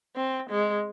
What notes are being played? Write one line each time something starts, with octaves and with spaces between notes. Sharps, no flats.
C4
G#3